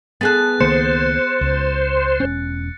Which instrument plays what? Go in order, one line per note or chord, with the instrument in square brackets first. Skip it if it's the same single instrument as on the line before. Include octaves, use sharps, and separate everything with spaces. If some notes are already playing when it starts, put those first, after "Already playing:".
[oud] B3 G#4 A4 [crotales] F#6 A6
[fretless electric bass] C#2 D#3 A#3 [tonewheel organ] C5 [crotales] C#7
[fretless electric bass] C#2
E1 C#4